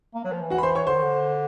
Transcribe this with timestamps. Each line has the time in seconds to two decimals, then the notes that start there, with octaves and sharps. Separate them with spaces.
0.15 A#3
0.24 F#3
0.32 F3
0.42 E3
0.50 F#4 F#5
0.58 B5
0.63 C5 C6
0.75 C#5 C#6
0.87 D3 C5 C6
0.95 D#3
1.03 D3